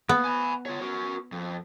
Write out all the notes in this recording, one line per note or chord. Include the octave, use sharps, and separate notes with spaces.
A#3 B3
G#5 B5
F4 C#5
F#4 A#4
F2